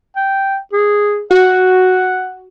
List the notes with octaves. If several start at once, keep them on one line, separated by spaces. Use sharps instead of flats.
G5
G#4
F#4 F#5